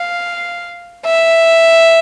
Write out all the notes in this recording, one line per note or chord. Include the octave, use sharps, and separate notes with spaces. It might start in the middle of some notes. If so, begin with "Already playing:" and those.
Already playing: F5
E5